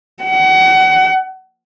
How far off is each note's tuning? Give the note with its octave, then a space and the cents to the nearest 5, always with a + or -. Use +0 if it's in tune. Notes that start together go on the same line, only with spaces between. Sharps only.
F#5 +30